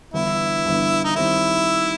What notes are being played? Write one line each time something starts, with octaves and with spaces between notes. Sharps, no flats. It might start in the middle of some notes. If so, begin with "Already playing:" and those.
G1 G2 E3 B3 E4
G1 G2 E3 B3
D#4
D#3 G3 C4 E4